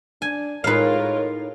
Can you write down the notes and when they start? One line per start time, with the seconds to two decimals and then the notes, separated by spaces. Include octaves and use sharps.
0.22 D4 G#5
0.64 A2 G#3 D#4 F4 A#4 B4 C#5 F5